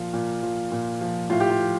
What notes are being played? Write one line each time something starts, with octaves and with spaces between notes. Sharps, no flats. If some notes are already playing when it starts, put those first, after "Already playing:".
Already playing: A#2 F3 F4
A#2
F3
A#2
F3
A2 F4
G4
F4
F3